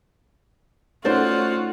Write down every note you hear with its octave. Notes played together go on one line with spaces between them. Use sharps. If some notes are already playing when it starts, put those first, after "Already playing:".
A3 C#4 D#4 F4 F#4 C5 D5